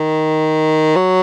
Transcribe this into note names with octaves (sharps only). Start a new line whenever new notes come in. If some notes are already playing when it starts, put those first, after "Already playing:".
Already playing: D#3
F#3